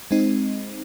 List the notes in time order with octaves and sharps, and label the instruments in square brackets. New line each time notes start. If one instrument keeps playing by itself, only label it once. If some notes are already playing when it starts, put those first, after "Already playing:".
[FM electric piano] G#3 C4 D#4